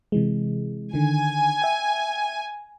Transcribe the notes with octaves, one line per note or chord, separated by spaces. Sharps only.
C3 E3 G#3
D3 D#3 G#5
E5 G5